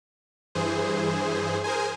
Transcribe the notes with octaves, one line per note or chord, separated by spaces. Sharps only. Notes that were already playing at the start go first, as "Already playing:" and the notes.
G2 E3 G#4 C5
G#4 A#4 C5 G#5